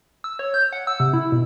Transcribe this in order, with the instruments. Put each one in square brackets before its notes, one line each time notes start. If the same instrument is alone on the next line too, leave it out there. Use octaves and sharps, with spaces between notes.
[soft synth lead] E6
C#5
G6
F#5
E6
C3
E4
B2